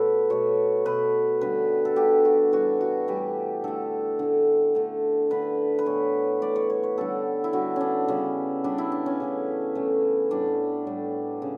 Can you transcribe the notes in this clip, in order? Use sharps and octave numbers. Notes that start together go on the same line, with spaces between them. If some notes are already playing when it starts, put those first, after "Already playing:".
Already playing: B2 A3 A4 B4 C#5
B2 A3 C#5
B2 A3 B4
D3 G3 B3 B4
A4
D3 G3 B3 G4
F#4
A2 E3 G3 B3 F#4
F#4
A2 E3 G3 B3 G4
D3 A3 A4
D3 A3
D3 A3
D3 A3 B4
B4
A2 E3 B3 C#5
A2 E3 B3 D5
C#5
C#5
C#5
D3 G3 B3 A4
E4
D3 G3 B3 F#4
C#4 D4
C#3 G3 B3 C#4
C#3 G3 B3 D4
E4
D4
C#4
C#3 E3 A3
C#3 E3 A3
A2 G3 B3 D4
A2 G3 B3
C#3